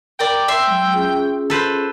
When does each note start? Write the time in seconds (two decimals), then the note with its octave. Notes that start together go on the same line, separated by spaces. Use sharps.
0.20 A#4 D5 G5
0.48 E5 C6
0.67 F#3 G#3
0.93 C#4 F4 G#4
1.50 A4 B4 C5